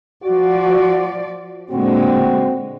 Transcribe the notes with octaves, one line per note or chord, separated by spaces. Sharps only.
F3 F#4 D5
A#2 D3 G#3 C4 F#4